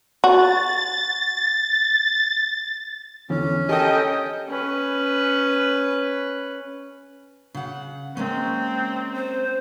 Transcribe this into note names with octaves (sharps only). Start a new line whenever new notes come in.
F#4 A6
E2 D3 E3 C#4
G4 A4 A#4 C#5 D#5 G5 G#5
C#4 B4
C#3 F#5
G#3 A#3 C4 C#4
C5